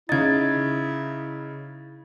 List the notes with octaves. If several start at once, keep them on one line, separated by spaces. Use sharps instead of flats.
C#3 D#4 E4 G#6 A6